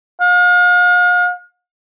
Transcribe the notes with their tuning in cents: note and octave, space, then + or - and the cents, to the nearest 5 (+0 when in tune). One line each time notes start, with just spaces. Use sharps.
F5 +40